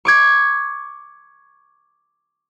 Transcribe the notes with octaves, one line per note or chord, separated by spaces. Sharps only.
C#6 D6 G#6